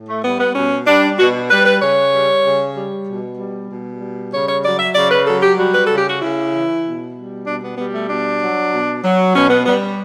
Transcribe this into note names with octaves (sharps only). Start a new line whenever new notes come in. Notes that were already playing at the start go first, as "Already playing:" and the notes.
Already playing: A2
A3
G3 B3
B3
B2 C#4
G3 D4
B2 F#4
G3 B4
B4
C#3 C#5
G3
C#3
G3
B2
G3
B2
G3
C#3 C#5
C#5
F#3 D5
E5
C#3 D5
B4
F#3 A4
G4
G3 F#4
B4
C#3 A4
G4
F#4
C#3 E4
E3
B2
G3
B2 D4
B3
G3 B3
A3
B2 D4
F#3
B2
F#3
B2 C#4
B3
G3 B3